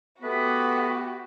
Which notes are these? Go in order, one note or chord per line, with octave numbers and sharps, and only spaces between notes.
A3 B3 F#4 G4 B4